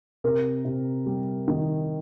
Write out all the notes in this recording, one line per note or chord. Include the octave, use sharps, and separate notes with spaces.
C3 A#4
C3
G3
D#3